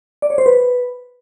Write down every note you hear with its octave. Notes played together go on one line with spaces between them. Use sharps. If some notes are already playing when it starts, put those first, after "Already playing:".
D5
C#5
C5
B4